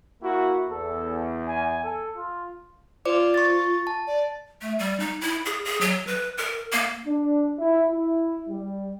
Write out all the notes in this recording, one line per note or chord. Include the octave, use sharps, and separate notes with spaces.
A#3 E4 F#4
E2 A4
G#5
A4
F4
F4 C5 D5 D6
C#6 A6
A5
D5
A3
G3
D#4
E4
G#4
G#4
F#3
B4
A#4
A#3
D4
E4
E4
G3